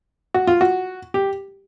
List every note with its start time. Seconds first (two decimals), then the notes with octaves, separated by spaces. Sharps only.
0.34 F#4
0.47 F4
0.61 F#4
1.14 G4